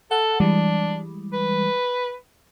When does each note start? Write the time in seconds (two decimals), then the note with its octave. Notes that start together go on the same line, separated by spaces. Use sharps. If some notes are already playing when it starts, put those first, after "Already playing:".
0.11 A4 F#5
0.40 E3 G3 G#3 D4
1.33 B4